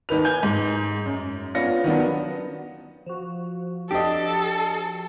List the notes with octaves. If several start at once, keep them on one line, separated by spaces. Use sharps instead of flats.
D#2 D#3 B4 F7
G#5 G6
G#2
F#2
B3 C#4 D4 F4 A#6 C#7
D#3 F#3 B3 D4
F3 F#4
D4 G4 A4 D#5